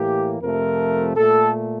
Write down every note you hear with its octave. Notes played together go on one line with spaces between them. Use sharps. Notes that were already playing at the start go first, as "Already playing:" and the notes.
Already playing: A2 E3 A#3 G4
F2 C3 F3 A3 A#4
A#2 A3 A4